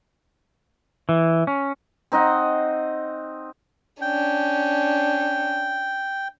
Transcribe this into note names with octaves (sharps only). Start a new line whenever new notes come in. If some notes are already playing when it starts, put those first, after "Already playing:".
E3
C#4
C4 D#4 D#5 F#5
C#4 D4 G5